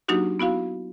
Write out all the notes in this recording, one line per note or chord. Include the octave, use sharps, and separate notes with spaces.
F#3 A#3 D4 D#4 F#4 G4
B3 E4 F#4 F5